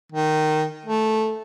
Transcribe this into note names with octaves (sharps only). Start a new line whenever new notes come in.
D#3
A3